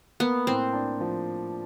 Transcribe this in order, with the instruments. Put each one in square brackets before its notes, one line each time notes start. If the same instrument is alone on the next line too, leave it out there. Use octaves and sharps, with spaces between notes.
[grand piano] A#3 [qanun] B3
[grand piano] A2 [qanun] C4
[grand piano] D4
F3